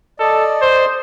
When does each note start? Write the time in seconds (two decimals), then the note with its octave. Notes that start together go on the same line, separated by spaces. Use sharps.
0.20 A4 D5 D#5
0.62 C5